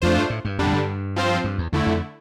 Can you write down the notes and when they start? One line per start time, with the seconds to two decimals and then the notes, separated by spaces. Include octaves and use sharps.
0.02 F2 A3 D4 F4 C5
0.16 G2
0.30 A2
0.45 G2
0.58 F2 D3 G3 D4
0.66 A2
0.73 G2
1.16 F3 C4 F4 C5
1.44 G2
1.58 E2
1.73 E2 D3 A3 E4
1.87 F2